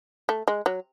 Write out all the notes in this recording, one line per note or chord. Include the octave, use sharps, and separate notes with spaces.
A3
G#3
F#3